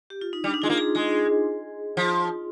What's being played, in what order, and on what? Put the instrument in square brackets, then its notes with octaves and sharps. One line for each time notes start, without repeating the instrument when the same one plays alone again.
[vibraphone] G4
F4
D#4
[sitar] G3 [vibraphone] D4
[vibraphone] D#4
[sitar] G#3 [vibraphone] F4
[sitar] A#3
[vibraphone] G#4
[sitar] G#3 [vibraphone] G#4
[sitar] F3 [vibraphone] F4